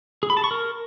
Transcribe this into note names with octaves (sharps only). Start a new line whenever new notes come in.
G#4
B5
A5
C#6
A#4